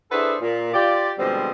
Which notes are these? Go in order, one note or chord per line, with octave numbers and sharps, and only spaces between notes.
D4 E4 G#4 A4 B4 C5
A#2
F4 G4 D5
B2 D3 F3 G3 G#3 C4